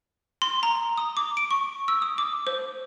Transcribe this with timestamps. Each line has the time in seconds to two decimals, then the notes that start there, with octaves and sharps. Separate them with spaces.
0.42 C6
0.63 A#5
0.98 D#6
1.17 D6
1.37 D7
1.51 C#6
1.88 E6
2.02 D#6
2.18 D6
2.47 C5